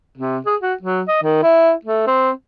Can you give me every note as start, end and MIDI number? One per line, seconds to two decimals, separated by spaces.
0.18 0.38 48
0.46 0.56 68
0.61 0.74 66
0.82 1.02 54
1.08 1.20 75
1.23 1.42 51
1.43 1.72 64
1.85 2.04 57
2.07 2.31 60